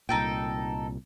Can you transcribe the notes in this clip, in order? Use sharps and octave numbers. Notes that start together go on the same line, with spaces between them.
C2 A#2 D#4 A4 G5